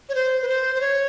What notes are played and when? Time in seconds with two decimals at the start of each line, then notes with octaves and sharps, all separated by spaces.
0.09 C#5
0.15 C5
0.42 B4
0.48 C5
0.75 C5
0.81 C#5